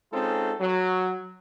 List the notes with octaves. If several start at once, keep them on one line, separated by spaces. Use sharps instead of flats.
G#3 C4 C#4 D#4 F4 A4
F#3